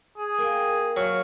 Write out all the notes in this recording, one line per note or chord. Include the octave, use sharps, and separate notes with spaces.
G#4
A#3 G5
F#3 F5